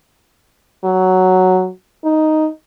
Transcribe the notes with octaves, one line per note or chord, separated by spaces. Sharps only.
F#3
D#4